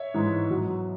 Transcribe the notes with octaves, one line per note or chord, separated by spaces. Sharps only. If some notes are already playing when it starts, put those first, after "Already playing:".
Already playing: C#5 E5
G#2 E3 G#3
B2 F#3